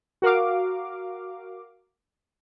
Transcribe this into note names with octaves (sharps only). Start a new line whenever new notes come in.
F#4 A#4 F5 D6